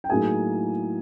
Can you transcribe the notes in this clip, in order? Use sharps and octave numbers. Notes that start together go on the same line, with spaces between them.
G5
A2 F#3 A#3 D#4 G#4 G#5